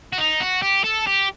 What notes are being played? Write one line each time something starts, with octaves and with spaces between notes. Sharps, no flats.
F#4
D#4
F#4
G4
A4
G4